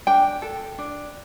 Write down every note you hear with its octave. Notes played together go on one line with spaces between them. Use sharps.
D4 G5
A4
D4